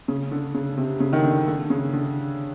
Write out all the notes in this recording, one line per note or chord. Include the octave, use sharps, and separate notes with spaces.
C#3
D3
C#3
C3
C#3
D#3
D3
D3
C#3
D3